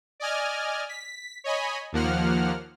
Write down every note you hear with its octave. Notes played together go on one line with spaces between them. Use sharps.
D5 D#5 G#5 F6
B6
C#5 D#5 G#5 B5
D#2 F3 A#3 F#5 F6